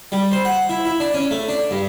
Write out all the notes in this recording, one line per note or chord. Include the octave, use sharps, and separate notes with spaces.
G3
C5
F#5
E4
E4
D4
C#4
A3
D4
G2